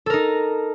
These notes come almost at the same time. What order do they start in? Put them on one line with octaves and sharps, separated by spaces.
A4 A#4 D#4